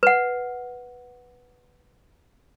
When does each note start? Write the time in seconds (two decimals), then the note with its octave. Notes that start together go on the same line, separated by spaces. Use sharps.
0.03 B4 F#5